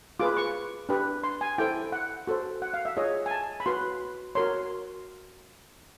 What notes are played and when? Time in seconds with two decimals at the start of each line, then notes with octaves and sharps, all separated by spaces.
0.19 F4 G#4 B4 D6
0.37 C#6
0.89 D4 G4 B4
1.24 C6
1.41 G#5
1.58 E4 A4 C5 G5
1.92 F#5
2.27 F#4 A4 C5
2.62 F#5
2.74 F5
2.85 E5
2.97 F4 G#4 C#5 D#5
3.26 G#5
3.31 A5
3.60 B5
3.66 F#4 B4 C6
4.35 F#4 A#4 C#5 C6